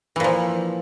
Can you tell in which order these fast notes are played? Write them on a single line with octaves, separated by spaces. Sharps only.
E3 A#2 F3